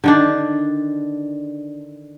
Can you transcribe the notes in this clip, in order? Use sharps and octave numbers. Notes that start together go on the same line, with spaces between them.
D3 D#3 D4